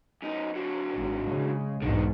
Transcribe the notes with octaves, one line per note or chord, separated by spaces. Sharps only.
F#2 D#4
D3 F#3
G#1
C#3 G#3
B1 E2 G#2 D3 D#3